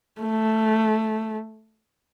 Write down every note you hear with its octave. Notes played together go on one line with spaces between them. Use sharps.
A3